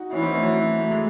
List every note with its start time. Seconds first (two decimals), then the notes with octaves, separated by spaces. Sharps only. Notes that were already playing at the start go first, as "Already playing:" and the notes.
Already playing: D#4 F#4
0.12 E3 C#4 E4
0.22 C4 D#4
0.32 A3 C#4
0.42 F#3 A3
0.79 A3
0.91 G#3